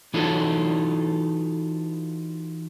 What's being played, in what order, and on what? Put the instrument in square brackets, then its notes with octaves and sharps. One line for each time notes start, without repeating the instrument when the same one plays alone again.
[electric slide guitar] E3 D#4 F4 F#4 A4